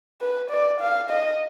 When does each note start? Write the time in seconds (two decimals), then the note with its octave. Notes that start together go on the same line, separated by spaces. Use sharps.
0.21 B4
0.50 D5
0.80 F5
1.10 D#5